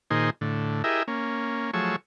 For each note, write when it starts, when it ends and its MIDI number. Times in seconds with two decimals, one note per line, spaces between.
0.10 0.30 46
0.10 0.30 51
0.10 0.30 63
0.10 0.30 68
0.10 0.30 72
0.41 0.83 45
0.41 0.83 50
0.84 1.03 64
0.84 1.03 67
0.84 1.03 68
0.84 1.03 70
0.84 1.03 75
0.84 1.03 76
1.08 1.71 58
1.08 1.71 61
1.73 1.96 53
1.73 1.96 54
1.73 1.96 57
1.73 1.96 68
1.73 1.96 73
1.73 1.96 88